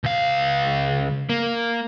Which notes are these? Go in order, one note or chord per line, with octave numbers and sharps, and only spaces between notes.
C#2 F5
A#3